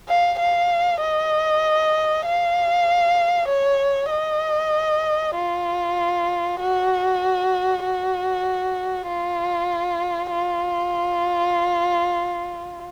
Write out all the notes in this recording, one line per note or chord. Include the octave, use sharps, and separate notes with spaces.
F5
F5
D#5
F5
C#5
D#5
F4
F#4
F#4
F4
F4